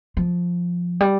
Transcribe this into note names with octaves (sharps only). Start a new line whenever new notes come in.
F3
G3